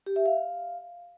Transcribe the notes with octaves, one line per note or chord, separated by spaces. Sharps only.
G4
E5
F5